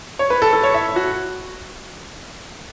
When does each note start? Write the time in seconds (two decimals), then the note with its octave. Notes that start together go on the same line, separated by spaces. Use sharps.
0.19 C#5
0.30 B4
0.42 A4
0.53 A4
0.63 C#5
0.74 E5
0.96 F#4